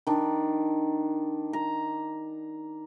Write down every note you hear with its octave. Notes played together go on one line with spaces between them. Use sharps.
D#3 D4
A#5